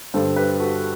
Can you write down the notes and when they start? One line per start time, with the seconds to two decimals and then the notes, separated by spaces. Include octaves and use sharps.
0.14 G2 D3 G3 A4 C5
0.36 G4 B4
0.60 F#4 A4